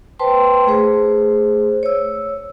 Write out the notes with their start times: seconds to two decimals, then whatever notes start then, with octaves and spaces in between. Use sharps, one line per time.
0.19 B4 C5 G5 A5 C6
0.67 A3 G#4 C5
1.83 C#5 E6